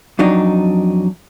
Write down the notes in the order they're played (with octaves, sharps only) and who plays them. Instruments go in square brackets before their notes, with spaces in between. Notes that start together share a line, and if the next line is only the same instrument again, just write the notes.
[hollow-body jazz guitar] F2 F#3 D4 D#4